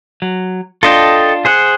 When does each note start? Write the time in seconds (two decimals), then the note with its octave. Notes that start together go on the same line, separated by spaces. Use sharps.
0.22 F#3
0.83 D4 F4 A4 D#5 G5
1.45 G#4 C5 F#5